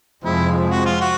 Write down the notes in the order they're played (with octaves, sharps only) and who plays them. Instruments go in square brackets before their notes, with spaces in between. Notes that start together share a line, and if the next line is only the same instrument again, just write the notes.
[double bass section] F2 C3 F3 G#3 C4 [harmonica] E4
[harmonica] F#4
F4
F#4